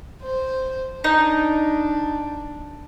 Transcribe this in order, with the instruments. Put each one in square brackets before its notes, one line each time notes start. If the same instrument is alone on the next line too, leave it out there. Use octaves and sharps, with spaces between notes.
[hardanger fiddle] C5
[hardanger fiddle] D4 [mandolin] D#4